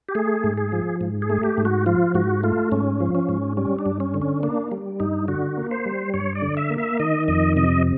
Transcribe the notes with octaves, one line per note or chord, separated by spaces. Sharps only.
G4
A3 G#4
G#2
G#4
F3
G#2
G#4
A3
G4
G#2
F#4
F3 F4
G#2 F#4
A3 F4
G#2 C#4
F3
C#4
G#2
G3 C#4
D4
G2
C#4
D3
C#4
A#3 D4
G3
G2 D#4
D3 F#4
A#3
C5
G3
G2 C#5
D5
D3
E5
A#3
E5
D#3 D#5
F2 D#5
C3 D#5